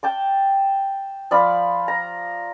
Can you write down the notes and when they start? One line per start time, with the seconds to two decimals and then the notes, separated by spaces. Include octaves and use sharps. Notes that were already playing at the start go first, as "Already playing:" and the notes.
0.03 G5 A5 D6
1.31 F3 D5 F5 B5
1.88 A#5